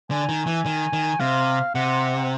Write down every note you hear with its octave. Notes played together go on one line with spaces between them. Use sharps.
D3 G#5
D#3
E3
D#3
D#3
C3 F5
C3 F#5